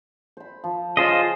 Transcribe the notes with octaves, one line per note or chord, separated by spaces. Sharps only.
C5 B5
F3
C#3 F4 C5 D#5 G#5 D6